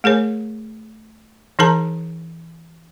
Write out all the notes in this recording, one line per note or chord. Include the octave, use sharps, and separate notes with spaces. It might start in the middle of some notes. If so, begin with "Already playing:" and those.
A3 G#4 A#4 C#5
E3 D#4 G#4 A#4 A5 A#5